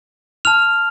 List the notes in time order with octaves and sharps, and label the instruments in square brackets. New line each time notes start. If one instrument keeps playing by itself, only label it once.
[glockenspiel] A5 F6 F7